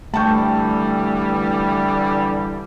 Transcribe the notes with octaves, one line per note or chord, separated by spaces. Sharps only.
D3 E3 G3 A3 G5 A5 C#6 G6